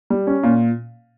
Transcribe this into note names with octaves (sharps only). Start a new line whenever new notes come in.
G3
C#4
A#2